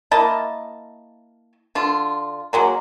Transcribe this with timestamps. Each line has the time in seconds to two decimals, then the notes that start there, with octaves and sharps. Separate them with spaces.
0.11 A#3 E4 D#5 A5
1.75 D3 F4
2.53 F#3 G#3 A#3